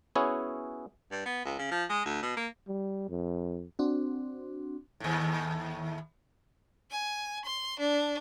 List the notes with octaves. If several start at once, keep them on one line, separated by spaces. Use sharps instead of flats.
B3 C#4 E4 F#4 G#4 C#5
G2
B3
C#2
C#3
F3
G#3
D2
B2
A#3
G3
F2
C4 D4 F#4
D#2 A2
G#5
C6
D4